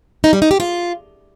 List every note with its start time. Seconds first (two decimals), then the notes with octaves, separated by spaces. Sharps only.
0.24 D#4
0.33 G3
0.42 D#4
0.51 G4
0.60 F4